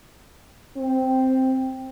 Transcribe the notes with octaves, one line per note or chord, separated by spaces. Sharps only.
C4